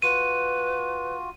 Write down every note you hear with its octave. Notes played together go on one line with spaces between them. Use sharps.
F4 F#4 B4 D#7